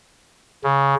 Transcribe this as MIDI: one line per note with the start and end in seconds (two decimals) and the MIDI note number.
0.64 0.95 49